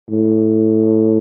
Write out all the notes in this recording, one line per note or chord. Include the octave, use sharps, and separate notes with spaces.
A2